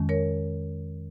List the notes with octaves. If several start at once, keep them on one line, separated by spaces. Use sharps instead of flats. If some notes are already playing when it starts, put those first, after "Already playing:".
Already playing: F2 D#3 G#3 C#4
A#4 C#5